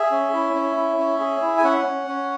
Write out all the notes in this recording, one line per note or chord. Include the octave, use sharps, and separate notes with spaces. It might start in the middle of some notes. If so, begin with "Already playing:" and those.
Already playing: G#4 E5
C#4
E4
C#4
E4
C#4
G#4
E4
G#5
C#4 F#5
C#4
C#4